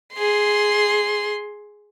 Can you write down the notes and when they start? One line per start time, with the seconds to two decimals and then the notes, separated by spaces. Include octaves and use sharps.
0.14 G#4 C6